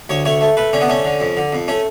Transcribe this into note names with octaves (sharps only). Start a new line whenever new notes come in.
D2 C#5
A3 C#5
A3
A3 B4
D3 C#4
B3
A3 C#4
D3
F2
D3
F2
A3 C#4